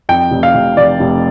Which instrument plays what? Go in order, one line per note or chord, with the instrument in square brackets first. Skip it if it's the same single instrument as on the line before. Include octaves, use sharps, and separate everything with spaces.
[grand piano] F2 G5
F1
F5
F1
F1 D5
F1